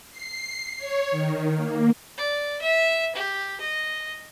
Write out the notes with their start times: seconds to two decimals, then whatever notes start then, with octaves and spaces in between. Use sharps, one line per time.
0.11 C7
0.78 C#5
1.11 D#3
1.57 A#3
2.18 D5
2.61 E5
3.15 G4
3.60 D#5